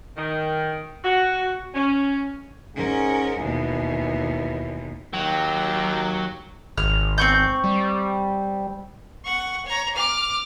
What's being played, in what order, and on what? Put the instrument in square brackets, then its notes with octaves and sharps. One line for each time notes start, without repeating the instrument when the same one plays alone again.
[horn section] D#3
F#4
C#4
[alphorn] G#2 [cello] C#4 A#4
[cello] D#2 B2 [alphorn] E3
[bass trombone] D#2 [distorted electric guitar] F#3 [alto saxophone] G5
[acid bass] G#1 [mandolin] F6
[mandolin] C4 C#6 G6
[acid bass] G3
[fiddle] F#5 C#6
C#5 A#5
D6 F6